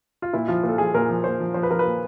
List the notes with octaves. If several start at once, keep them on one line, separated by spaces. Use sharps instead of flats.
F4
A#2 E4
F3 F4
A#2
A4
F3 G#4
A#2 A#4
F3
A#2 C5
F3
F3 C5
B4
F3 A#4
B4
A#2